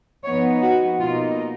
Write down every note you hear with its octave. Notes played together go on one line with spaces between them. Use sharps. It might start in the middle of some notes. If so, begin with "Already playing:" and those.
F3 B3 D#4 C#5
F#4
B2 A#3 D#4 F4